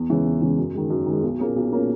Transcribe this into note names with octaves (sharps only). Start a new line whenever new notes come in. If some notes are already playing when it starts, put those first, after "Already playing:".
Already playing: E2
C#3 E3 G#3 C#4
E2
C#3 E3 G#3 C#4
F#2
D#3 G#3
F#2
D#3 G#3
B1
A#2 A#3 C#4 G#4
B1
A#2 A#3 C#4 G#4